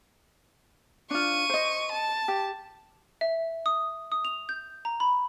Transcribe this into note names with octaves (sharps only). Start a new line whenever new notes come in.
D4 F4 C#6 D#7
C5 D#5
A5
G4
E5
D#6
D#6
F7
G6
A#5
B5